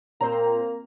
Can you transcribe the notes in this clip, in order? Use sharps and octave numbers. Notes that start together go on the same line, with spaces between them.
A#2 A#3 C4 C5 A#5